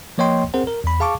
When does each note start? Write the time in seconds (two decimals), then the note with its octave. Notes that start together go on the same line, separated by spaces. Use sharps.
0.18 F3 A#3 C#5 D#5 G5 C6
0.54 C4 G#4 A#4 C5 F#5
0.67 A#4
0.84 E2 B5
1.00 G#4 F5 A5 C#6 D6